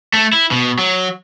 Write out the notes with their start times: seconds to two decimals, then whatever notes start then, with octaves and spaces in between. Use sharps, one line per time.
0.13 A3
0.33 E4
0.51 B2
0.79 F#3